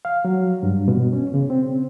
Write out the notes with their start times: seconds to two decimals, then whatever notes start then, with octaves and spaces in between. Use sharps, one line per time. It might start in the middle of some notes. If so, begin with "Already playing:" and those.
0.05 F5
0.25 F#3
0.63 G2
0.88 B2
1.13 C#4
1.34 C#3
1.50 C4